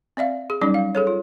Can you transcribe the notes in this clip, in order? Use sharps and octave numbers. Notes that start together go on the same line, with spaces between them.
C4 D5 E5 F5
G#4
F#3 G3 C#4 D#4 D5
F5
G#4 A4 C#5
F4